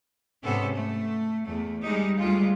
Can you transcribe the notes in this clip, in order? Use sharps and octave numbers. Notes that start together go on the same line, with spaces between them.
G#2 C3 B3 C#4 A4 C5
A3
E2 A3
G3 G#3 D#4 G4
D2 G3 G#3 F4